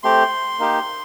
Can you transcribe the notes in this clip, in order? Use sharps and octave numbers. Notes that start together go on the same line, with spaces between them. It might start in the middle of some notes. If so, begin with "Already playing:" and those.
A3 C4 G4 C6
A#3 D#4 G4